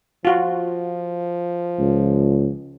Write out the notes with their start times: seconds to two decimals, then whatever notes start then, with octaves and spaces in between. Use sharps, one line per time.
0.25 F3 F4 F#4
1.79 C#2